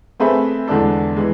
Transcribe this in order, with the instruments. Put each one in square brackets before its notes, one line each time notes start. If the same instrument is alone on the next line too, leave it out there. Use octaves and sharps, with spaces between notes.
[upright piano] A3 C4 G#4 B4 E5
E2 D3 G#3 D4 A4
E3 G#3